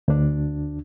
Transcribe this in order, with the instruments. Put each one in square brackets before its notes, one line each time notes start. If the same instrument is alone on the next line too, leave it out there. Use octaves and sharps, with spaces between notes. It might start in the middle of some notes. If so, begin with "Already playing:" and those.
[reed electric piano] D2 D4